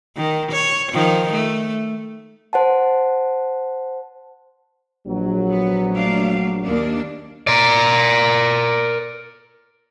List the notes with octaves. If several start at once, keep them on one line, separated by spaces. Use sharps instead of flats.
D#3
C#5
D#3 F3
A3
C5 F#5 A5
A#1 F#3
B3
A3 D4 F5
D#2 A#3 D4
A#4 D5